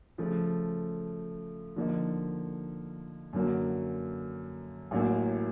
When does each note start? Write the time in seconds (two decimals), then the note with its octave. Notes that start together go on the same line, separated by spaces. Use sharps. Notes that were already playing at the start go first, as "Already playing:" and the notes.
0.18 C#3 F3 A3
1.76 D3 F3 A#3 D#4
3.33 F#2 D3 F#3 A#3
4.91 A1 A2 F#3 A#3